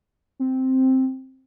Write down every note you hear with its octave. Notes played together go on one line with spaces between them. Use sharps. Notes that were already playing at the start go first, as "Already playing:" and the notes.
C4